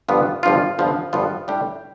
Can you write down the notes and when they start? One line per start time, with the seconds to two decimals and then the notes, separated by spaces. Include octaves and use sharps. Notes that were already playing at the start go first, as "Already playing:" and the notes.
0.08 G1 G2 F3 B3 F4
0.43 G1 G2 F3 B3 F4
0.79 G1 G2 F3 B3 F4
1.13 G1 G2 F3 B3 F4
1.48 A2 G3 D4 G4